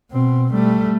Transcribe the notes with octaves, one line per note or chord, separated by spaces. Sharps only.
B2 C4
G3 A3